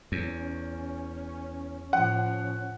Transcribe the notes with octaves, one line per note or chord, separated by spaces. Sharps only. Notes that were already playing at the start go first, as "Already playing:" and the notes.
E2 C#4
A2 F3 F#5